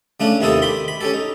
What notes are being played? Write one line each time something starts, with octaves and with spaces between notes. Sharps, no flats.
C#3 A3 C#4 D4
D#2 C3 D#4 E4 A4 D#6
G4 B5 C6
B5
C#4 G4 A4
D#4